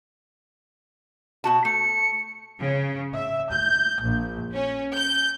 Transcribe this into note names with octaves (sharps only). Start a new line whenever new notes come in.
B2 F#4 A5
A3 C#7
C#3
E5
G6
A#1
C#4
G6